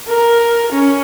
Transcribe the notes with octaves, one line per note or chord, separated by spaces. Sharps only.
A#4
C#4